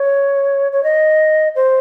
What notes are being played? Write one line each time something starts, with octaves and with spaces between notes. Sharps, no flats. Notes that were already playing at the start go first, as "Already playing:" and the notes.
Already playing: C#5
C#5
D#5
C5